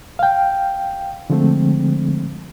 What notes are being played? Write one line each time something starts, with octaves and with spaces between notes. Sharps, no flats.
F5 G5
D3 F3 G#3 A3 C4